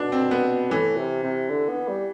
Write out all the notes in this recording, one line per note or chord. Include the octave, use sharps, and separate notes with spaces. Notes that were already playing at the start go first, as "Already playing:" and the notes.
Already playing: B2 D4
C4
B3
A2 E3
C3
C3
D3
B3
G3